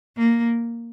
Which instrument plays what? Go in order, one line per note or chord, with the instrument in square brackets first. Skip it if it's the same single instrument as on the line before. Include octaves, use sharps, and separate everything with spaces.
[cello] A#3